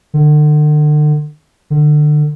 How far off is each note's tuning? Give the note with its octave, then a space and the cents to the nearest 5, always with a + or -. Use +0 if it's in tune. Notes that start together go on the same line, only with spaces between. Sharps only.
D3 +40
D3 +30